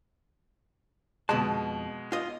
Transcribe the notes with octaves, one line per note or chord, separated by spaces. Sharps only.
F2 B2 G#3 A5
F4 D#5